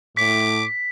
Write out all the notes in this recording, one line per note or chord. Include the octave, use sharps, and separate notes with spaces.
A2 D6 B6